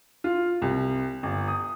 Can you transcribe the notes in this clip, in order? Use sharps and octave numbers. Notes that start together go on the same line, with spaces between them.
F4
C2
G1
D#6